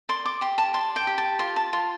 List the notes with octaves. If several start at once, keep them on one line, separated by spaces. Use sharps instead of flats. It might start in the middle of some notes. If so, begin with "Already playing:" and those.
D5 C6
D6
G4 C6
A5
D5 C6
G5
G4
A5
F4 C6
A5
F4 C6